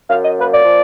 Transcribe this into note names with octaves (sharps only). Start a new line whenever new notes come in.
F#2 F5
D#5
A#3 B4
D5
F3